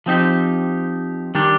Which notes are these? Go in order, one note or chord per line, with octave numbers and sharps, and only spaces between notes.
F3 C4 D#4 G4
D#3 G3 D4 G4